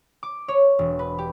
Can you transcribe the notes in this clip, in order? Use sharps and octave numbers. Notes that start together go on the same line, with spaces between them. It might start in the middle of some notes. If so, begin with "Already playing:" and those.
D6
C#5
E1
B4
G4